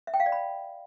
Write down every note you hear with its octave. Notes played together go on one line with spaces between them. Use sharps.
E5
G5
F5
D5
B5